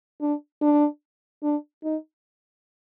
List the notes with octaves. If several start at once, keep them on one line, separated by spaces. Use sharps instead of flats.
D4
D4
D4
D#4